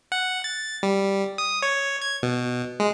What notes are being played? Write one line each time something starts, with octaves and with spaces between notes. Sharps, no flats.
F#5
A6
G3
D#6
C#5
G#6
B2
G#3